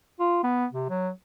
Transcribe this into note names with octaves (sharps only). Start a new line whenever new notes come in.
F4
B3
C3
F#3